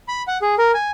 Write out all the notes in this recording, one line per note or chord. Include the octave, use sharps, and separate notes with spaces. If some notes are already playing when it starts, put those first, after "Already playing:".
B5
F#5
G#4
A#4
G#5